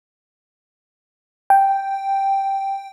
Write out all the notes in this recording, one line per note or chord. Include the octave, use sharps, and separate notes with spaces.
G5